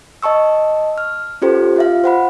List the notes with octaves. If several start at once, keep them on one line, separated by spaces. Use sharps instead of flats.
D#5 A5 C#6 E6
F6
C#4 F4 G4 A4 C5
F4 E5 F5
C5 F#5 B5